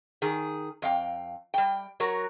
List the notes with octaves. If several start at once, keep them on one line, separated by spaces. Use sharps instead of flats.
D#3 G#4
F2 F5 G5
G3 G5
F#3 F#4 A#4